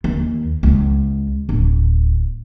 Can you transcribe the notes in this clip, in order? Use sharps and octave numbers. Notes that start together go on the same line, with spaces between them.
D#2
C#2
D1